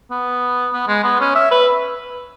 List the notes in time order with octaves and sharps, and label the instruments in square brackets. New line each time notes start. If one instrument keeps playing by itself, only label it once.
[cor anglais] B3
B3
G#3
B3
C#4
E5
B4